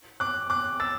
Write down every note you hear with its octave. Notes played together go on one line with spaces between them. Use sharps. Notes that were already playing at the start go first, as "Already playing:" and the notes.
D6 F#6
D6 F#6
E6 A6